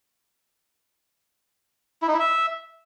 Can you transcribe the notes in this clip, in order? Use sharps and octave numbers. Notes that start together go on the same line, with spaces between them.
E4
D#4
E4
E5